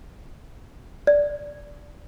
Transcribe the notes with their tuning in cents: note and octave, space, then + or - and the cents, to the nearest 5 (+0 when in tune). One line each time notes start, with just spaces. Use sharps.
D5 -5